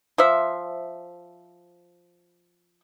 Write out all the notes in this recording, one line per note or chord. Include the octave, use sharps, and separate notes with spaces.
F3 C5 E5